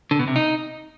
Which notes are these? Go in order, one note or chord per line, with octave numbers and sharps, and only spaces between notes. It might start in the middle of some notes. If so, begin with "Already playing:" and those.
D3
B2
C3
D#4